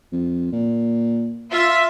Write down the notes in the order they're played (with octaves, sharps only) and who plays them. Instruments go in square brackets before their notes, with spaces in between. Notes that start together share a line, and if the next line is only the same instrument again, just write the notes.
[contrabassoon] F2
A#2
[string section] F4 E5